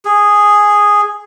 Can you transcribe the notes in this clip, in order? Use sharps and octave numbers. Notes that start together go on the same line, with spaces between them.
G#4